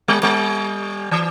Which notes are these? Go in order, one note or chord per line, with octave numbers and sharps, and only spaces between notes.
G3
G3
E3